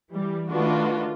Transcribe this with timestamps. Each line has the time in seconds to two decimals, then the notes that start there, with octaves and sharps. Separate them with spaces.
0.12 E3 G3
0.49 D#3 A3 D4 F4 F#4 B4